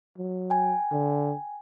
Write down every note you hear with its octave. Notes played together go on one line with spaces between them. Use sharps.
F#3
G5 G#5
D3